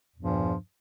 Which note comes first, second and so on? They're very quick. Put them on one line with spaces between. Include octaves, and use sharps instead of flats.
E2 A#2 G2 F3